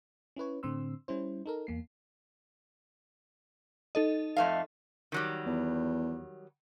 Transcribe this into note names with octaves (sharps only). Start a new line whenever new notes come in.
C#4 E4 B4 C#5
A2 D3 C4 C6 E6
G3 C#4 E4 C5
D#4 A4 A#4
E2 A#3 C7
D#4 A4 D#5
F2 A3 F5
D#3 F#3 G3
E2